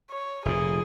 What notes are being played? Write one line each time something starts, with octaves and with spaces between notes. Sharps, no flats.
C#5
F1 A#2 G#4